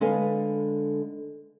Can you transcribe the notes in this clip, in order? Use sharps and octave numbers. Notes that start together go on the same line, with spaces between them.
D3 G#3 A4 B4 F5 G#5